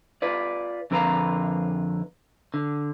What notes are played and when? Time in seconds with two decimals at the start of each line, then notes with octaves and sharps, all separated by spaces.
0.22 F4 B4 D5
0.91 F2 D3 A#4 B4 F5 A#5
2.54 D3